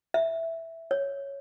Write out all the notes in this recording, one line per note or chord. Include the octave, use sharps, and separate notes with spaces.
E5
C#5